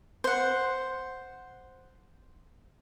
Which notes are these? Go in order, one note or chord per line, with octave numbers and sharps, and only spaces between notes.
C5 F#5